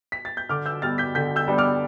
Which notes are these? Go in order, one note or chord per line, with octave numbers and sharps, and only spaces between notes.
B6
A6
G6
D3 D6 F6
E6 G6
G3 B3 D4 F6 A6
G6 B6
D3 G6 B6
E6 G6
G3 B3 D4
D6 F6